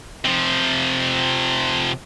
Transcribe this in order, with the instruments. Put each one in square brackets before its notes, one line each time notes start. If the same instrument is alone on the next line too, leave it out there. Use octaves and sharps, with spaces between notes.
[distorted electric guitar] C3 F3